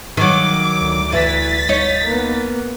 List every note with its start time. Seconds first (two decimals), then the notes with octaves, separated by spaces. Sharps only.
0.17 D#3 F#3 D6
0.78 D2
1.12 E3 A6 B6
1.69 D#4 C#5
2.04 A#3 B3